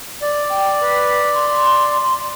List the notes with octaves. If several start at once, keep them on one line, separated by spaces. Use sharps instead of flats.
D5
G5
B4
C6